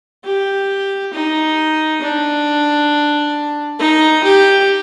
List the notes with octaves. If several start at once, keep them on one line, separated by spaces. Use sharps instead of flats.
G4
D#4
D4
D#4
G4